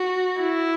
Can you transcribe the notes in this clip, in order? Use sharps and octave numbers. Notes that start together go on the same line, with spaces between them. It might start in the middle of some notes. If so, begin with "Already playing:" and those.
Already playing: F#4
E4